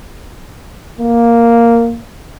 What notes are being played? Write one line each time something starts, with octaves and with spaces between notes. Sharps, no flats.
A#3